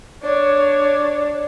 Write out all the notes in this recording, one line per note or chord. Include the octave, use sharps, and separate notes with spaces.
D4 C#5